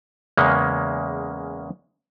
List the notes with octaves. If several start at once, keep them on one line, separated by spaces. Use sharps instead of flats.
E2 C#3 G#3 A#3 C#4